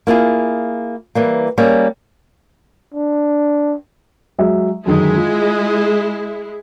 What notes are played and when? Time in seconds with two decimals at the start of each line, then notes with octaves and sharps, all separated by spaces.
0.07 A#3 E4 F4 G#4
1.15 E3 G3 A#3
1.58 G3 A#3 C#4 G#4
2.94 D4
4.38 F#3 G#3 E5
4.86 F#2 D3 D#3 G#3 E4
5.16 F4